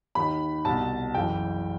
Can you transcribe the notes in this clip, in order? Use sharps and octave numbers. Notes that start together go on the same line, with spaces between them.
D#2 D#3 B5
C2 B2 A5
F#1 F#2 E3 G5